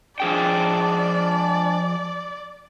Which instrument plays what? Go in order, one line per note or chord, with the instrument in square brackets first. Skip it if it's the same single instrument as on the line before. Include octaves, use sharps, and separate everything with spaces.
[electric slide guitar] F3 G#4 G5 [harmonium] G#3 D4 [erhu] D5